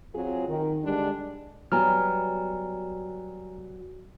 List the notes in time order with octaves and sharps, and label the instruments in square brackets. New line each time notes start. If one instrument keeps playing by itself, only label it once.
[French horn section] F#3 C4 F4 G#4
D#3
D3 G3 G#3 D4
[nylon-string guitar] F#3 G3 B3 [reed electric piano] G#5 A#5 F6